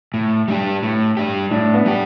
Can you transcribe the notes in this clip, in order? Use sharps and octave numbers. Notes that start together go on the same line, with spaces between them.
A2
G3 D4 G4
A2
G3 D4 G4
A2 D4
B3
G3 D4 G4